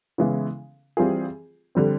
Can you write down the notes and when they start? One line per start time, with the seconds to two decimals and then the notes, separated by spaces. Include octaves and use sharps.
0.18 C#3 E3 G#3 B3 E4
0.97 E3 G3 C4 F4 G#4
1.75 D3 G3 C4